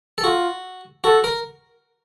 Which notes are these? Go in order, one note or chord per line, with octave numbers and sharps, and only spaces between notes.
A4
F4 F#4
F#4 A4
A#4